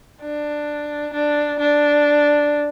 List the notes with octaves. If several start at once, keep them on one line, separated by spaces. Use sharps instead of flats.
D4
D4
D4